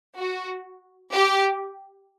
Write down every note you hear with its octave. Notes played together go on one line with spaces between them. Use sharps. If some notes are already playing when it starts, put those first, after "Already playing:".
F#4
G4